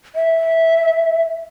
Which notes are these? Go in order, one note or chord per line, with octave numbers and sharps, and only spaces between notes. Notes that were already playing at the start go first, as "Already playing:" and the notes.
E5